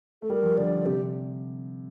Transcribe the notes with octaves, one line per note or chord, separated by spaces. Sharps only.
A3 A4
G3 A#4
F3
D3 D5
C3 G4